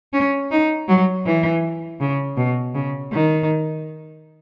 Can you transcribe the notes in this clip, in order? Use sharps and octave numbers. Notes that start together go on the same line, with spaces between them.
C#4
D#4
F#3
E3
C#3
B2
C#3
D#3